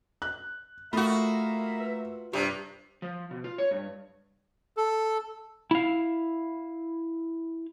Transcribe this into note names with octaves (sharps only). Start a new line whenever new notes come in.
F#6
A3 A#3 F4 F#4 A#4 E5 B5 D#6
B4
G2 C3 G4
F3
B2
F4
C#5
G2
A4
E4 F5